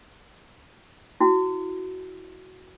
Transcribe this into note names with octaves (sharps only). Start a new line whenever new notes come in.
E4 F#4